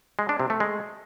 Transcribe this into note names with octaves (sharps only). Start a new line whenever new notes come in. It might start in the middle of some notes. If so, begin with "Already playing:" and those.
G#3
D4
C3
A3
G#3